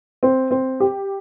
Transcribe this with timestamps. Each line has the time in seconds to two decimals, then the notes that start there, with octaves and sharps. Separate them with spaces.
0.23 C4
0.51 C4
0.80 G4